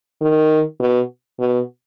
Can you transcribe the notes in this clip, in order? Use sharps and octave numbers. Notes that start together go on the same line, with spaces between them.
D#3
B2
B2